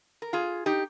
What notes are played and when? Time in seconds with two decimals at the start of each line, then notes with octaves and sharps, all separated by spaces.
0.22 A#4
0.33 F4 G#4
0.66 D#4 G4